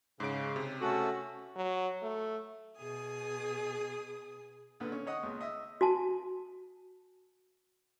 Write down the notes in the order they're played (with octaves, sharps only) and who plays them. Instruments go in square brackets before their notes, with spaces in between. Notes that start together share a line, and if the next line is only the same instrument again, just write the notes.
[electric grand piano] G#2 D7 [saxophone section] C#3
[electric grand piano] C3
[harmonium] A3 C#4 A4 [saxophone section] F#4
[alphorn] F#3
A3
[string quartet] B2 G#4 G#5 D#6
[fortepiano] A#2 D3 B3
C#4
C#5 D#5 F#5 D#6
C#2 A#2
D#5 E5
[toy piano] F#4 G#5 A5